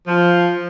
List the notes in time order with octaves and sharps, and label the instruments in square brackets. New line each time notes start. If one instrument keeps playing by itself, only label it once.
[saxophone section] F3